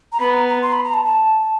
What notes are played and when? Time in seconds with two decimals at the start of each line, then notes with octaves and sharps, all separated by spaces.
0.13 A#5
0.20 B3 B5
0.34 A#5
0.48 A#5
0.62 C6
0.72 B5
0.84 A#5
0.94 A5
1.04 A5